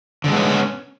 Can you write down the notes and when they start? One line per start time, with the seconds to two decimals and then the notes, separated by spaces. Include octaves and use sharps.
0.24 D3
0.27 G#3
0.31 B3
0.34 C#4